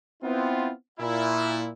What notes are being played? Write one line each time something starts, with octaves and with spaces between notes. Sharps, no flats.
B3 C4 E4 F4
A#2 E4